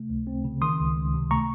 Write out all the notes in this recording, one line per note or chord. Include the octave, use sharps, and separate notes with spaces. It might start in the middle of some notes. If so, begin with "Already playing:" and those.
Already playing: C3 A3
C#2
C4
C#3
D#3 C6 D#6
C#2
C#2
C3
A3 A#5 C#6